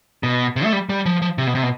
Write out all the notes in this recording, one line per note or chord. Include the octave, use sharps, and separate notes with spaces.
B2
C3
A3
G3
G3
F3
F3
C3
B2
C3
B2